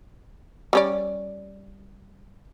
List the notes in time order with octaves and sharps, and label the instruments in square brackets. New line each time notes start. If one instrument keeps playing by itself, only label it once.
[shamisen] G3 C#4 D5